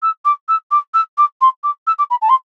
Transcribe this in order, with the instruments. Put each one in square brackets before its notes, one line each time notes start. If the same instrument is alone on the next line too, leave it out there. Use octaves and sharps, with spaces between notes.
[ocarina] E6
D6
E6
D6
E6
D6
C6
D6
E6
D6
B5
A5
C6